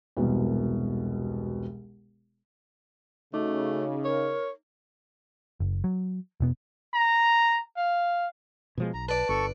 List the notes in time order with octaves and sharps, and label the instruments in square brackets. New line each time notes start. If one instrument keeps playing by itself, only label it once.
[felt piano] E1 C2 B2
[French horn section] C#3 [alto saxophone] A3 [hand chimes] D#4 D#5 D6 [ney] F#4
[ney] A#4 [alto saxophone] C#5
[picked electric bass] F#1
F#3
E1 B2 B3
[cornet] A#5
F5
[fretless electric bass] B2 F3 G#3
[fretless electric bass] B1 [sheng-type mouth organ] A#5
[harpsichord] B4 D5 [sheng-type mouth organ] A5
[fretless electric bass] G1 [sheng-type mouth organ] A4 C#6